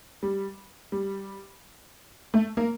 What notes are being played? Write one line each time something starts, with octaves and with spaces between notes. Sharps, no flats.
G3
G3
A3
A#3